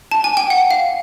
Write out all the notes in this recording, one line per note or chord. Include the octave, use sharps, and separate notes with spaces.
A5
G#5
G5
F#5
F5